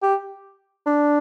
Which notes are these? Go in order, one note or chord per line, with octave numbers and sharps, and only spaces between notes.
G4
D4